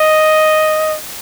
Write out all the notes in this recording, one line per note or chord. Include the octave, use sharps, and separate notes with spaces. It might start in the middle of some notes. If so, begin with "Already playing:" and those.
Already playing: D#5